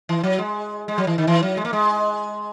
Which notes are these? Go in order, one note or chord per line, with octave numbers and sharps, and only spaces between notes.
E3
F#3
G#3
G#3
F#3
E3
D#3
E3
F#3
G#3
A#3
G#3